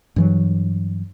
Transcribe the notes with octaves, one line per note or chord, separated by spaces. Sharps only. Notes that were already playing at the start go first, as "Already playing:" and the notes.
G2 E3 F#3